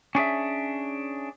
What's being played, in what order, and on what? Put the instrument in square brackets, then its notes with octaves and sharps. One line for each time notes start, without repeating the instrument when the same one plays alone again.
[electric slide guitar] C#4 D4 G#4 E5